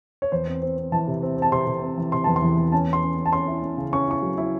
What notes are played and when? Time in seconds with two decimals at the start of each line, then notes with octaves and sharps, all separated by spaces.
0.22 C#5
0.32 E2 C5
0.47 C4
0.62 C4
0.77 C4
0.92 E3 A5
1.07 C3
1.22 C4
1.37 C4 A5
1.52 C3 C6
1.67 C3
1.82 C4
1.98 E3
2.12 C3 C6
2.24 E2 A5
2.36 C6
2.42 E3
2.58 E2
2.72 C#4 A5
2.88 C#4
2.93 C6
3.03 C#4
3.17 C#4
3.26 A5
3.33 C#4 C6
3.47 E4
3.63 C#4
3.77 C#3
3.93 C#4 C#6
4.08 E4 C#6
4.23 F#3
4.38 E4